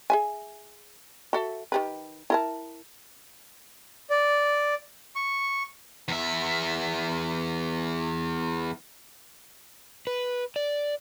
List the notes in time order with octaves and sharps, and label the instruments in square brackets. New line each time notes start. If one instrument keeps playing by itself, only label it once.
[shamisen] G#4 E5 G#5
F#4 A4 E5
D#3 G4 B4
E4 A#4 A5
[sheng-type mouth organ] D5
C#6
[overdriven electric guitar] E2 E5
[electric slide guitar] B4
D5